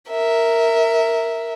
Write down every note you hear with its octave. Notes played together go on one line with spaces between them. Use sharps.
A#4 E5